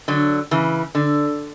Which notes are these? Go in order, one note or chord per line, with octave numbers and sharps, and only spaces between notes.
D3 F#3
C#3 E3
D3